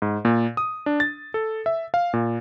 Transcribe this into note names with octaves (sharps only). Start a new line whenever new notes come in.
G#2
A#2
D#6
D4
A6
A4
E5
F5
A#2